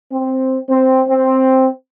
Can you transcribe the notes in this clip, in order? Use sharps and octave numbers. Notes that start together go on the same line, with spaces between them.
C4
C4
C4